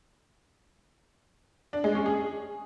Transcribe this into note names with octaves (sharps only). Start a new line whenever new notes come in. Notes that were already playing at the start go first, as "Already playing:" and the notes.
D4
G#3
C#4
G#4